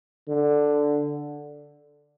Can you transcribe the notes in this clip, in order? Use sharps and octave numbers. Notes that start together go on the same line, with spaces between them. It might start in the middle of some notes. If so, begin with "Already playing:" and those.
D3